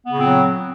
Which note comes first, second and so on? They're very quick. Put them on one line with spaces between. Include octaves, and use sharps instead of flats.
B3 C#3 A#2 C4 F#3